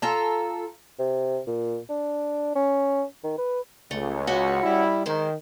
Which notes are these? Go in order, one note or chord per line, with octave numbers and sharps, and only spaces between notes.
F4 A4 A#5
C3
A#2
D4
C#4
D#3
B4
C#2 A3
C#4 F#4 F#5
G3 E4
D#3 G#3 C5